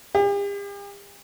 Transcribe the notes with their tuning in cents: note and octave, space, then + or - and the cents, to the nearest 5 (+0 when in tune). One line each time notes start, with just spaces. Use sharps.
G4 +45